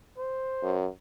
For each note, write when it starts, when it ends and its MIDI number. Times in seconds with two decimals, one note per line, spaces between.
0.18 0.78 72
0.63 0.88 42